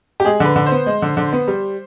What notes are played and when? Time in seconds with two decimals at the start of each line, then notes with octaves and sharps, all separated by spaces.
0.20 G4
0.25 G#3 G#4
0.40 D3
0.45 B4
0.56 D3
0.66 C5
0.71 B3
0.86 G#3
1.02 D3
1.17 D3
1.33 B3
1.48 G3